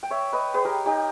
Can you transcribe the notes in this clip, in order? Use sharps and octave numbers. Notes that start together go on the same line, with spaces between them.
G5
C#5 E5
B4 D#5
G#4 B4
G4 A#4
D#4 G4